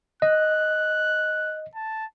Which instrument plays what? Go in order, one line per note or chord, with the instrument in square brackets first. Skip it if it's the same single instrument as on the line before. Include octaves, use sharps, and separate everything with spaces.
[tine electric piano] D#5 [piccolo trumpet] F#6
[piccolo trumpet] A5